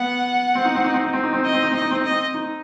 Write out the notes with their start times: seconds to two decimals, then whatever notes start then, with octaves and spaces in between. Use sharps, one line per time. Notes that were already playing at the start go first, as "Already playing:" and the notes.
Already playing: B3 F#5
0.55 C4
0.65 D#4
0.75 C4
0.85 D#4
0.94 C4
1.04 D#4
1.13 C4
1.24 D#4
1.33 C4
1.43 D#4 D#5
1.53 C4
1.63 D#4
1.72 C4 D#5
1.82 D#4
1.91 C4
2.01 D#4 D#5
2.11 C4
2.34 D#4